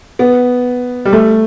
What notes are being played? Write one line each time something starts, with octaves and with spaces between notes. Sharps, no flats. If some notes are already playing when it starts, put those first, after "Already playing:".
B3
G3
A3